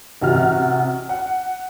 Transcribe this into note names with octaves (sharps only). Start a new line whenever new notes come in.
A1 C3 F#4 F6
F#5